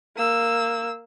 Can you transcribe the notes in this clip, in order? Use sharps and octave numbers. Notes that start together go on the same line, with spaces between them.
A#3 E6